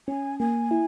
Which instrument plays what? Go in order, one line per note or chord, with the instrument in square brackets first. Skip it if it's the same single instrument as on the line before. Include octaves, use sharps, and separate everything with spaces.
[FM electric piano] C#4 [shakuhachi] G#5
[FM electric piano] A#3 [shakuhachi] G#5
[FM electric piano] E4